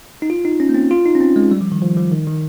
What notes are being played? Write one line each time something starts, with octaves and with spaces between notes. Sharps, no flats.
D#4
F4
D#4
C#4
A#3
C4
F4
D#4
C#4
C4
G#3
G3
F3
D#3
F3
F3
D#3
D#3